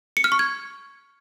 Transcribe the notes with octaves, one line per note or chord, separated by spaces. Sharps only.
C#7
F6
C#6
G#6